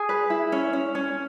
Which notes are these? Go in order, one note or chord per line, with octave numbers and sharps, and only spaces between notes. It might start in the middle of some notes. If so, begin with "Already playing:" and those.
Already playing: G#4 G#5
B4
E4
C#4
C#4
C#4